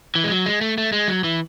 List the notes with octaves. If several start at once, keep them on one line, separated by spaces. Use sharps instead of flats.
E3
G#3
F#3
G#3
A3
A3
G#3
F#3
E3